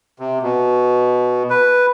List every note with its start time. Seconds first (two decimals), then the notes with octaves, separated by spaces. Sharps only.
0.19 C3
0.42 B2
1.50 B4